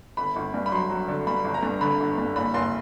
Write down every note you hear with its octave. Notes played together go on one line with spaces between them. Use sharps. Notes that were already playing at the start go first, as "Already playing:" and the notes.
G1 B5
G1
G2
B5
F#3 C6
F#3
D3
G2 B5
G1
A#5
G2
D3 B5
G1
G2
F#1 B5
F#1 C6